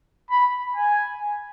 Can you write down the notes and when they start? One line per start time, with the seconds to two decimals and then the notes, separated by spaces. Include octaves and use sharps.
0.30 B5
0.76 G#5